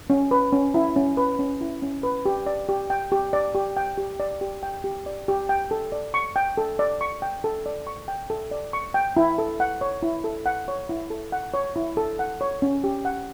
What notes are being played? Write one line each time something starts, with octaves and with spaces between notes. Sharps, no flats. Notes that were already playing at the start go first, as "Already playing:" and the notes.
C#4
B4
C#4
E4
C#4
B4
C#4
E4
C#4
B4
G4
D5
G4
G5
G4
D5
G4
G5
G4
D5
G4
G5
G4
D5
G4
G5
A4
D5
C#6
G5
A4
D5
C#6
G5
A4
D5
C#6
G5
A4
D5
C#6
G5
E4
A4
F#5
C#5
E4
A4
F#5
C#5
E4
A4
F#5
C#5
E4
A4
F#5
C#5
C#4
G4
F#5